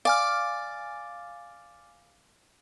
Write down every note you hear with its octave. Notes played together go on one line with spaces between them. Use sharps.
D5 F5 G#5 F6